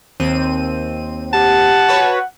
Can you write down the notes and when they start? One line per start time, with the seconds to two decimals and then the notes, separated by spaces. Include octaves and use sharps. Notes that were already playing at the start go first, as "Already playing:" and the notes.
0.20 D#2 C4 D#7
1.33 G4 F#5 A5
1.89 F#4 B4 C#5